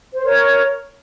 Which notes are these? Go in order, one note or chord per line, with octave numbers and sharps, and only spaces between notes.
C5
A#4 C#5